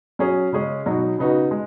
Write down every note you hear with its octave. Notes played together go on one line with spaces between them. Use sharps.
F#3 C#4 G#4
C#3 G#3 C#4 G#4
B2 F#3 D#4 F#4
C#3 B3 D#4 F#4
G#3